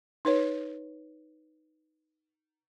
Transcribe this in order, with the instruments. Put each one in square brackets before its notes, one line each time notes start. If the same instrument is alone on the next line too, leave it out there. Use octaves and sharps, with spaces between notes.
[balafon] D#4 B4 C#5